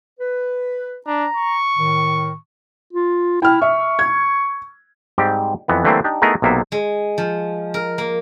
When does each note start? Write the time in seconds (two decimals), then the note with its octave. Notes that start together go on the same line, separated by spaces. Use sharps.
0.20 B4
1.07 D4 A#5
1.37 C#6
1.77 A2 D#3
2.93 F4
3.42 E4 G5 F6
3.62 E5 C#6
3.99 G#6
5.18 G#2 G3 C4 G4 G5
5.68 F2 E3 B3
5.84 D3 E3 G3 A3 A#3 C4
6.04 D4 D#4 G4
6.22 A3 B3 D#4 E4 G#4 A#4
6.42 B1 C3 A#3 B3 E5
6.72 G#3
7.18 F3
7.74 A#4
7.98 A#3